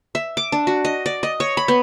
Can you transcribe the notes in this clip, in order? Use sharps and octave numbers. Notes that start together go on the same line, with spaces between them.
E5
D6
D4
F#4
D#5
D5
D#5
C#5
B5
B3